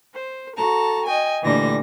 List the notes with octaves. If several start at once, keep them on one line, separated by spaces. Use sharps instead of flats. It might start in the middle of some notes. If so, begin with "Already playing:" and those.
C5
F#4 A4 A5 A#5
D#5 G5 G#5
D2 A#2 D3 E3 G3 A#6